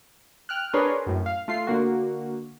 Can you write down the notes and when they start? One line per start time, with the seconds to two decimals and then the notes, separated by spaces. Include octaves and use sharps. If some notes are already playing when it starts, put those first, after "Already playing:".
0.49 G5 F6 F#6
0.73 D4 G#4 A#4 B4 C#5 C6
1.07 F#2 A2
1.26 F5
1.48 A3 F4 C7
1.67 D3 A#3 F#4